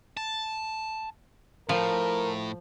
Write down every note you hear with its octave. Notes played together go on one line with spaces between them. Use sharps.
A5
A2 F3 A#4